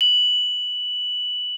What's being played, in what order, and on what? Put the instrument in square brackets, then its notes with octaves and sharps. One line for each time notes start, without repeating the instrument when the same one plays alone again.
[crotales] F#7